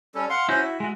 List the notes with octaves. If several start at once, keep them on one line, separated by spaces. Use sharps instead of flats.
G3 C#4 A4
F5 F#5 C6
C#4 E4 F#4 C5
E5
G#3 F#4